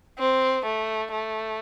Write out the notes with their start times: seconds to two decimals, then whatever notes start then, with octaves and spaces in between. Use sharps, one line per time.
0.19 C4
0.66 A3
1.12 A3